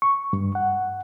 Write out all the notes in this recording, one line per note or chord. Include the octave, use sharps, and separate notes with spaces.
C#6
G2
F#5